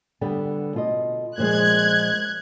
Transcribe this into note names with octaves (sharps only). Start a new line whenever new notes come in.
D3 G3 B3
B2 F4 D#5
A#2 F3 G#3 F#6 G#6